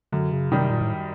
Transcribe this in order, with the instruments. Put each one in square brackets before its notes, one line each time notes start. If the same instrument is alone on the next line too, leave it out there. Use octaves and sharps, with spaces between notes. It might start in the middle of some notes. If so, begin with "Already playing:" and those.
[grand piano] F#2 [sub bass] D3
[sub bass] C#3
[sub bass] C3 [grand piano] D#3 G3
[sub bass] A#2
A2